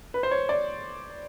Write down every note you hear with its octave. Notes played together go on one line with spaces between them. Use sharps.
B4
C5
C#5
D5